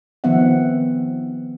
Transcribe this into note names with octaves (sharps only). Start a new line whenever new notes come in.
D#3 F3 B3 C4 E5 F#5